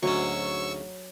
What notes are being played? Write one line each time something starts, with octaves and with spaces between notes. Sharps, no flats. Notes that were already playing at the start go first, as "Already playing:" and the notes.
D2 G#2 F#3 C#4 C#6 E6